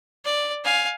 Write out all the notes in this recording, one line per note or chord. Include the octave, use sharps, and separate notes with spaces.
D5
F5 G#5